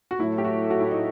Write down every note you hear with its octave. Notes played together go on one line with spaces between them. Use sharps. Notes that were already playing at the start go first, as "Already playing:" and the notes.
F#4
A2 F#3 A3 E4
G4
F#4
F#4
E4
D#4